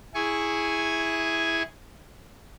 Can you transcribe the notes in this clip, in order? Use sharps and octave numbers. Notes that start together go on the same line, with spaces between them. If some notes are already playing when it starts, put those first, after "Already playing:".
E4 G#4 G#5 C#6